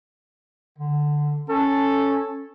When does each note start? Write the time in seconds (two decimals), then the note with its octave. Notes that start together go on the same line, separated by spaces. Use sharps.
0.78 D3
1.49 C#4 A4